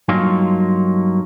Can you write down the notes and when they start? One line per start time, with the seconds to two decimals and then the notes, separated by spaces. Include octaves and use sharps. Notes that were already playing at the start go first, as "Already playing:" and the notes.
0.08 G2 F#3 A#3 D#4 F4